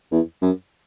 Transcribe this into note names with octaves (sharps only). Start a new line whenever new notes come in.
E2
F#2